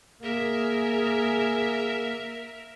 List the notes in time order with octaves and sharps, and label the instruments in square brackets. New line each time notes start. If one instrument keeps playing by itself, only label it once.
[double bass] A#3 [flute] G#4 [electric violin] A#4 E5